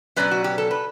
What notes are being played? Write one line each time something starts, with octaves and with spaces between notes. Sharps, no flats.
B2 F#3 C#4 B4 D5
F#4
G4
A4
B4